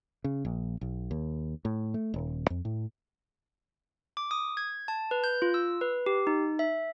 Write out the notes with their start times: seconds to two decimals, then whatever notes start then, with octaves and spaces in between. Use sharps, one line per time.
0.24 C#3
0.45 A#1
0.81 B1
1.11 D#2
1.65 A2
1.94 A3
2.14 D#1
2.50 F2
2.65 A2
4.17 D6
4.31 D#6
4.57 G#6
4.88 A5
5.11 B4
5.24 G6
5.42 F4
5.54 E6
5.81 B4
6.06 G4
6.27 D#4
6.59 E5